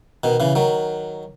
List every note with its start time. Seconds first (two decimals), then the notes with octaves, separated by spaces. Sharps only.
0.24 B2 D#3
0.40 C#3 E3
0.55 D#3 F#3